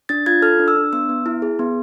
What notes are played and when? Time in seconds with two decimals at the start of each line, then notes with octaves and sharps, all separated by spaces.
0.09 D4 A6
0.26 F4 G#6
0.42 A4 F6
0.59 D4
0.68 E6
0.76 D4
0.93 B3 E6
1.09 B3
1.26 E4
1.42 G#4
1.59 B3